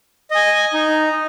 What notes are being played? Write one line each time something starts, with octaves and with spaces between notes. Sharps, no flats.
D#5 G#5
D#4